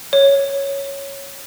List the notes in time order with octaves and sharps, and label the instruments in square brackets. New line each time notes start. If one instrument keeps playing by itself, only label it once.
[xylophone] C#5